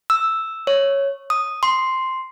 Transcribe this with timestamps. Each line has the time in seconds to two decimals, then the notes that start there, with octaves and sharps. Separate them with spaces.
0.10 E6
0.67 C#5
1.30 D#6
1.63 C6